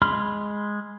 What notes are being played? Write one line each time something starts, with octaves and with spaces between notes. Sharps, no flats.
G#3 B5 C6 F6